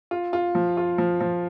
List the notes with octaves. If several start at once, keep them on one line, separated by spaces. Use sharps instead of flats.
F4
F4
F3
F4
F3
F3